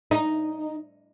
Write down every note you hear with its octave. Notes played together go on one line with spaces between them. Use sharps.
D#4